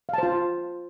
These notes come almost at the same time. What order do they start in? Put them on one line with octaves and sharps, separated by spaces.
F5 A5 C5 F4